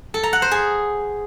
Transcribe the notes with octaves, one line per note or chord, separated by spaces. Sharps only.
A4
A#5
F#5
C5
G#4